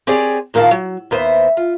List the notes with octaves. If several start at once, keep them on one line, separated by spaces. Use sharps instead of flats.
C4 G4 G#4 C#5 D5 G#5
E2 A#2 D#3 D#4 F5 A5
F#3
D#2 B3 C5 E5
F4